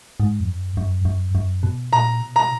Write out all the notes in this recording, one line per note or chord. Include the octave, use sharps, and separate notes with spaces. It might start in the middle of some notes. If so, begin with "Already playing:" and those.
G#2
F2
F#2
F#2
F#2
F#2
B2
A#2 A#5
B2
A#5